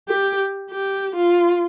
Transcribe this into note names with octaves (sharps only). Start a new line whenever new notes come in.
G4
G4
F4